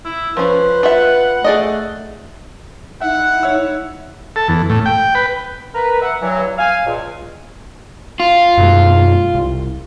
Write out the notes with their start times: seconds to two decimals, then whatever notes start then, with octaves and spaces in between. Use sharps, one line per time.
0.05 E4
0.37 F3 C#4 B4 C5
0.83 F4 E5 F#5
1.44 A3 G#4 D5 D#5
3.01 D#4 E4 E5 F#5
3.43 C#5 E5 E6
4.36 A4
4.48 E2
4.70 A2
4.85 G5
5.15 B4
5.75 A#4 B4
6.02 E5 F#5
6.22 G2 E3 F#3
6.58 F5 G#5
6.86 C#2 A#2
8.20 F4
8.58 F#2 B2 G#3
9.34 C2